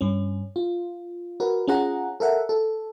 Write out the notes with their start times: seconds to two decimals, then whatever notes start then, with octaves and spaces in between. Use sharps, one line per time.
0.01 G2 C#4
0.56 F4
1.40 F#4 A#4 B4
1.67 C#4 F4 G#4 F#5 A#5
2.20 A4 A#4 E5 F#5
2.49 A4